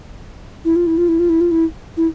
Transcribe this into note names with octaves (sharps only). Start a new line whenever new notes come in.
E4
F4
E4
F4
E4
F4
E4
F4
E4
E4